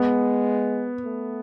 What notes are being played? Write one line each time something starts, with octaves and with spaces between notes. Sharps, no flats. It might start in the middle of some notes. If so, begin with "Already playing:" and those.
Already playing: G#3 B3
A3